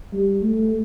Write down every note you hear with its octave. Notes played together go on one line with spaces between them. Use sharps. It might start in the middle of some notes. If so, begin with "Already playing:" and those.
G3
A3